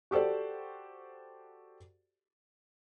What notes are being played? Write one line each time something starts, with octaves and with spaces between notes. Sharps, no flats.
F#4 G4 A4 C5 D5